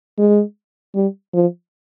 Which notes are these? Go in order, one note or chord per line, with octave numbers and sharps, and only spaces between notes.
G#3
G3
F3